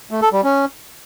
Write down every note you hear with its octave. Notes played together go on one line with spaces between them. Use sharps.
A3
A4
G3
C#4